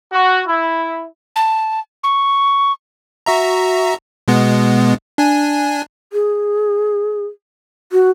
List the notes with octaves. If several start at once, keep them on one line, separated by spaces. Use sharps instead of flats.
F#4
E4
A5
C#6
F#4 E5 A#5
B2 G#3 B3
D4 G#5
G#4
F#4